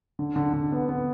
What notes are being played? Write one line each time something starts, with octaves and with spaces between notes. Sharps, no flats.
D3
D3
D3
B3
B3